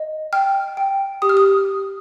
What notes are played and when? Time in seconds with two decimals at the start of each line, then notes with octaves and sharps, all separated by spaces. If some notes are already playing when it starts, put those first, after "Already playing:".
Already playing: D#5
0.33 G5 F6
0.77 G5
1.22 G4 D#6
1.29 F6
1.37 D#6